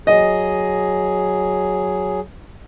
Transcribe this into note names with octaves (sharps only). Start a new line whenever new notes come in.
F#3 G#4 D#5